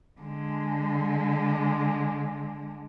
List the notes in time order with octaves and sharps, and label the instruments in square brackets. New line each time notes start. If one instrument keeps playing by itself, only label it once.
[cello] D3 G#3